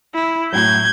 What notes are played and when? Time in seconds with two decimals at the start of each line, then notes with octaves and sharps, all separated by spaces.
0.15 E4
0.53 A2 F#3 G6 G#6